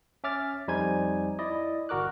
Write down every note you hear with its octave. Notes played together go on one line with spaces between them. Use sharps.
C#4 E5 D6 F6 A6
F2 G3 D#4 C5 G#5 G#6
E4 D5 D#5
G1 F#4 A#4 D6 F#6